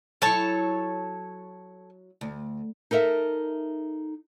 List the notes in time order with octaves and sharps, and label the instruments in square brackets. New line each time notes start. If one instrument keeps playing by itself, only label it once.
[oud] F#3 E4 [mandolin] A4 C#5 A5
[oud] D2
[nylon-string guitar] D#4 A4 A#4 E5